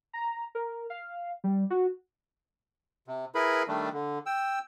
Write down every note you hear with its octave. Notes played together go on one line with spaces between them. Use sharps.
A#5
A#4
F5
G3
F#4
C3
E4 G#4 A#4 B4 B5
D#3 G3 A3 D4
D3
G5 E6